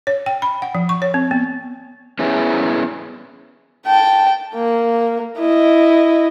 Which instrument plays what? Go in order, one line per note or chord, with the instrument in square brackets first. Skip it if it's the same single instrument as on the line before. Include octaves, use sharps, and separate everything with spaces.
[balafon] C#5
G5
B5
F#5
F3
C#6
C#5
C4
B3
[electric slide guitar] B3 C#4 E4 G#4
[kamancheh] G5 A5
A#3
E4 D#5